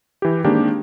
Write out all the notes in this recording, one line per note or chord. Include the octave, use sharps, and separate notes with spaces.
E3 G4
D#3 G#3 A#3 C4 D4 G4